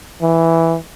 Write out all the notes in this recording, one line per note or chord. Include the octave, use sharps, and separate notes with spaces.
E3